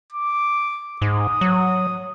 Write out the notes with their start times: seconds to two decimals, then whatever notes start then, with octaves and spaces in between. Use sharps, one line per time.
0.13 D6
1.02 G#2 D#6
1.41 F#3